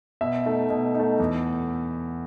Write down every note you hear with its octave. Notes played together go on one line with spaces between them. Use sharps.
B2 E5
A3 D#4
B2
D#4
A3
E2